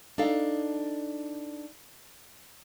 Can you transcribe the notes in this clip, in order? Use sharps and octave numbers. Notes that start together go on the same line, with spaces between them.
D4 D#4 A4 F5